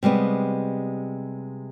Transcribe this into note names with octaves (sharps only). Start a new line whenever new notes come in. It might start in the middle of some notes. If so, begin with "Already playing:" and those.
C3 G3 G#3 B3